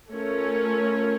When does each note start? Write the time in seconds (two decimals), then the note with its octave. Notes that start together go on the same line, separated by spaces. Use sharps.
0.11 A3 C#4 F4 A#4 C#5